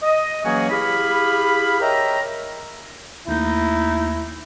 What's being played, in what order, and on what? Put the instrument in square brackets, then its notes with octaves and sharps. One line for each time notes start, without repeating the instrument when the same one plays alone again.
[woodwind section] D#5
E3 F#3 A#3 C#4 F#4 G#4
E4 G4 G#4 F5 B5
A#4 C#5 D#5 E5 G5 A#5
[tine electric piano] D#2 A3 A#3 [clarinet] D#4 [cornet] E4